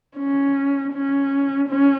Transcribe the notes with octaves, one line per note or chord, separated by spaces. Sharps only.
C#4
C#4
C#4